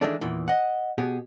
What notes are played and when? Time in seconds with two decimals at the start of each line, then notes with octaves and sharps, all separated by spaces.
0.01 D#3 E3 G#3 A3 D4
0.21 E2 A#2 D#3 E3
0.48 D#5 F#5
0.98 B2 B3 G4 G#4